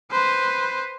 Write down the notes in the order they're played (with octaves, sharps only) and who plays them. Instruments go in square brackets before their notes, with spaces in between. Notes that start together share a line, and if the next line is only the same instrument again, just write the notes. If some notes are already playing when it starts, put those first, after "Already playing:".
[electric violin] B4 C5